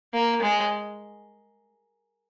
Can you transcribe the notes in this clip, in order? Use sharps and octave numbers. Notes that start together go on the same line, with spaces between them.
A#3
G#3